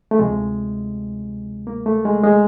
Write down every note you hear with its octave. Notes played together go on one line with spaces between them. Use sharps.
A3
D2 C3 F3 G#3
A#3
A3
G#3
G#3